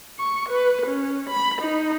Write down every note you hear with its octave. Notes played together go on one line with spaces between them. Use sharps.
C#6
B4
C#4
B5
D#4